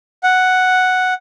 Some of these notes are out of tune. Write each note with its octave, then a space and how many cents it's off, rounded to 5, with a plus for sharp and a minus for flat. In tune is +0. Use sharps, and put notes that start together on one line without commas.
F#5 +0